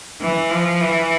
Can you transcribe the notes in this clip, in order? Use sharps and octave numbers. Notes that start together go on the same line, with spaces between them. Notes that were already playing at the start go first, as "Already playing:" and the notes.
E3
F3
E3